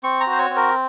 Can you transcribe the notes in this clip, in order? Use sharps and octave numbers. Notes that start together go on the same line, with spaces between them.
C4 C#6
A#5
F#4
C5
C#5
C4
A#4